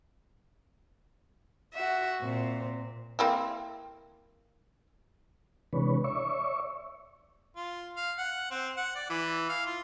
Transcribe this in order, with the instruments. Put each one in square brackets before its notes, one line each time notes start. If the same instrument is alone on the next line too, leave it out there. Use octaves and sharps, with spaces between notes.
[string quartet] F#4 E5
A#2 C4
[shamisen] A#3 C4 E4
[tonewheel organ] C3 E3 G#3 D4 B4 C#5
C#5 D5 E5 C#6
[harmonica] F4
F5
F#5
C4
F#5
D5
E3
F5
F4